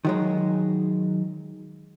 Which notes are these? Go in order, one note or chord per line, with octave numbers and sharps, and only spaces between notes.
D#3 F#3 G#3